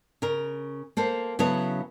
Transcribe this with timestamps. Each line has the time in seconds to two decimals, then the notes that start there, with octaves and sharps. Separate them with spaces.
0.22 C#3 A#4
0.97 A#3 A4 C5
1.39 C#3 F#3 B3 E4 A4 C#5